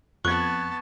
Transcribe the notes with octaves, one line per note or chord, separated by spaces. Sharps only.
F2 B3 A5 C#6 F#6 G#6